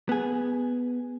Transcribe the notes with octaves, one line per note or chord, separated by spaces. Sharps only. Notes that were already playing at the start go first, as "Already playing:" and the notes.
B3 G#4